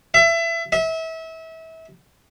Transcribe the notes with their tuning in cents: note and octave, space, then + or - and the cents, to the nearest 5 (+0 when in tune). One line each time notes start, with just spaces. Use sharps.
E5 +25
E5 -30